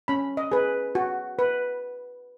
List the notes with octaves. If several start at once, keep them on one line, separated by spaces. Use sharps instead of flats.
C#4 B5
D#5
G#4 B4
F#4
B4